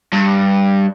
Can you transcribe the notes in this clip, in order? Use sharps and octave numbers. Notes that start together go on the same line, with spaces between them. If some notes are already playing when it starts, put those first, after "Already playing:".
G2